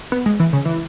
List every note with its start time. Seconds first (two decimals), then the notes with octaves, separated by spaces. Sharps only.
0.12 B3
0.26 G#3
0.40 E3
0.53 C#3
0.65 E3